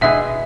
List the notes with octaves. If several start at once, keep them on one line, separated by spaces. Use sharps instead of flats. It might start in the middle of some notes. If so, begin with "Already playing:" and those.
B2 G#3 E4 G#4 E5